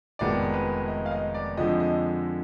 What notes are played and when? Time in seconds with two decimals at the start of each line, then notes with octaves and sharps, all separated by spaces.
0.19 F1 F2 D#3 G#3 B3 D5
0.54 B4
0.88 D#5
1.06 F5
1.11 D#5
1.34 D5
1.57 F2 D3 F3 G#3 D#5
1.80 D#5